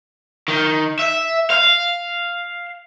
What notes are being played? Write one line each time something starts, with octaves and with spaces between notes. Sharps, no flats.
D#3
E5
F5